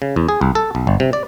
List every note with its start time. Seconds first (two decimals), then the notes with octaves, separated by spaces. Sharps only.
0.02 C#3
0.16 E2
0.29 G#4
0.41 C2
0.55 A4
0.75 B1
0.87 G1
1.00 C3
1.13 D5